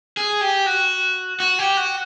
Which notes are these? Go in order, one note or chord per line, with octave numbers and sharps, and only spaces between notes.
G#4
G4
F#4
F#4
G4
F#4